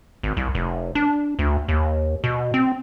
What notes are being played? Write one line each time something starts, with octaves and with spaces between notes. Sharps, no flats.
G#1
C2
F1
D4
D2
D#2
B2
C4